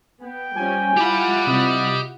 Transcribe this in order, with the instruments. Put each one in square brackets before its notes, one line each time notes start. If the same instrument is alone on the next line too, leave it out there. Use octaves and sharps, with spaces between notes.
[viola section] B3 [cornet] G5
[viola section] F3 G3 C#4 [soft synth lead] G#5
[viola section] E4 F4 F#5 [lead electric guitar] G4 B5
[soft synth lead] C3 [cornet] D#5